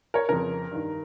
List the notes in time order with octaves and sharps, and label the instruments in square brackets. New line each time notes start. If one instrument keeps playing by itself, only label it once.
[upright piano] A#4 C#5
F2 C#3 A#4
G2 D#3